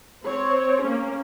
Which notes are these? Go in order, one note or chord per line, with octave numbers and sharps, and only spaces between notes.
C4 C#5
A#3 C#4